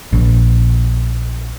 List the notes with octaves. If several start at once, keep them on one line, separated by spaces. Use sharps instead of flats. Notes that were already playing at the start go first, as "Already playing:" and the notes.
A#1